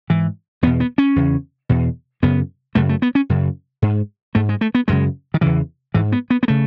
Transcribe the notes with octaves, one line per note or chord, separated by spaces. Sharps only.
G#2 E3
E2 B2 B3
B3
C#4
E2 C#3
E2 B2
F#2 C#3 B3
F#2 C#3 A3
A3
B3
C#4
F#2 C#3
G#2
G#2 A3
G#3
A3
B3
F#2 C#3 G#3
D#3
E2 C#3 E3
G#2 E3
B3
B3
B3
C#3 A3